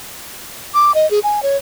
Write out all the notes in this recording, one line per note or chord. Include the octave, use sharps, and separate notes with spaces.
D6
D#5
G#4
G#5
C#5